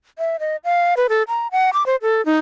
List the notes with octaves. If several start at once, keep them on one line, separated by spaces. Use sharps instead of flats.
E5
D#5
F5
B4
A4
A#5
F#5
D6
C5
A4
D#4